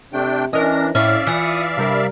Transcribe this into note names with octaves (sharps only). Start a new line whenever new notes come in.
C3 A3 D4 G5
E3 C#4 D4 A#4 D#5 A#6
A2 C#4 E4 D5 E5 F5
E3 F4 D#6 C#7
G2 C3 G3 A#4